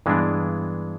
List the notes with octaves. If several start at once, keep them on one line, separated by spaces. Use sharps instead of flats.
G2 E3 G#3 B3 D4